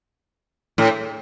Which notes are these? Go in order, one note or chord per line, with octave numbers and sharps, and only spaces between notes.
A2